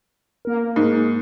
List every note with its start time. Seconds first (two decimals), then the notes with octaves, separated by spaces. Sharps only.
0.45 A#3 A#4
0.76 G#2